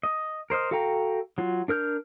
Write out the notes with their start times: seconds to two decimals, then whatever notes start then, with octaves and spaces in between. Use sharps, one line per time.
0.03 D#5
0.50 A#4 C5 D#5 F6
0.71 F#4 A4 F5 G5 A#5
1.38 F#3 F4
1.68 D4 A#4 F6 G6